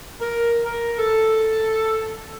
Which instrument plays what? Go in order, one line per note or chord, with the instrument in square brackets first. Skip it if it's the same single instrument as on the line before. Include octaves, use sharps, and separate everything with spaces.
[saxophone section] A#4
A#4
A4